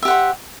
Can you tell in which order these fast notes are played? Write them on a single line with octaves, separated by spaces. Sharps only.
E5 G4 F#5 C5